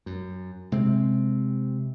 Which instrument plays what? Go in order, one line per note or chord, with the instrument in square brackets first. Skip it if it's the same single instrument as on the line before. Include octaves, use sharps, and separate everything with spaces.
[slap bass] F#2
C3 G#3 C4